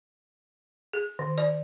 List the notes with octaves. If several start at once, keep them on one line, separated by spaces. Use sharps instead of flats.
G#4
D#3
D5